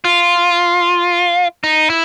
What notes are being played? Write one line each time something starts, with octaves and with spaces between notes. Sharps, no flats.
F4
D#4
E4